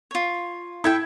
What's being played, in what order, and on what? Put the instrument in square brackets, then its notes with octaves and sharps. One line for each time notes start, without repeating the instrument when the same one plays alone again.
[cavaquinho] F4 C#5
[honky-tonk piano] E4 G#6 [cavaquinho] A4 E5 G5